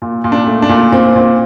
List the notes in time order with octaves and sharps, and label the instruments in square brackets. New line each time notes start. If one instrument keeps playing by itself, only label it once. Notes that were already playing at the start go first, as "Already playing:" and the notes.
[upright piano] A#2
A#2
D4
A3
D4
A#2
A#2 C4
A#2